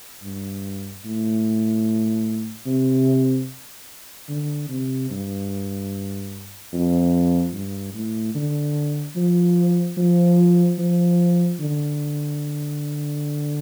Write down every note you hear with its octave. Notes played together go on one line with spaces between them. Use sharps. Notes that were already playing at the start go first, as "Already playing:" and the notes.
G2
A2
C3
D3
C3
G2
F2
G2
A2
D3
F3
F3
F3
D3